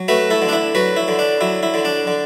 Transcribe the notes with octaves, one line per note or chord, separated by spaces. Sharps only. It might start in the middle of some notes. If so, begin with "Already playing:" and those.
Already playing: F#3
A3 F#4 B4
E4 A4
D3
D4
E4
F#3 F#4 B4
E4
D3
D4
F#3 E4
E4
D3
D4
D3